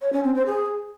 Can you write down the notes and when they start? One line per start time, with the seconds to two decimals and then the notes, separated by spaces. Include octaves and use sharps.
0.01 C#5
0.13 C#4
0.24 C4
0.35 C5
0.46 G#4